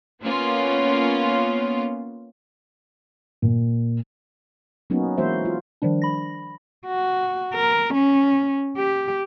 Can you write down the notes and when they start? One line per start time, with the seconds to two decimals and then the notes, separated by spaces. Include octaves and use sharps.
0.23 A#3 B3 C#4 F4
3.42 A#2
4.90 F#3 A#3 B3 C#4 D#4
5.18 E3 G#3 A#3 F#4 C5 E5
5.45 F4
5.82 D#3 F3 G3 D4
6.02 B5 A#6
6.86 F#4
7.55 A#4
7.94 C#4
8.77 G4